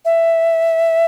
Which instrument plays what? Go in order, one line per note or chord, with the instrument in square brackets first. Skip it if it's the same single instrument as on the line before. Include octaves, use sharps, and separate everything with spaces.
[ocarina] E5